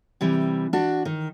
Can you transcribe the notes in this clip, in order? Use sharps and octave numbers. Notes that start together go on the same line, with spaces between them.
C3 E3 G3
D4 F#4
D#3